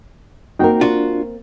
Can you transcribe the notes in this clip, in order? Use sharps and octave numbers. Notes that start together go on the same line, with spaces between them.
A#3 C4 D#4 F#4 A#4 G5
D4 F4 F#4